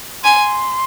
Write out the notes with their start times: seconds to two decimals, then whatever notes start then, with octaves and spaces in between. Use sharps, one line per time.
0.23 G#5 C6